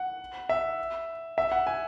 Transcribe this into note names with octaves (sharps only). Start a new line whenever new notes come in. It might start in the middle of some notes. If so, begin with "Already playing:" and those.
Already playing: F#5
E5
E5
F#5
G#5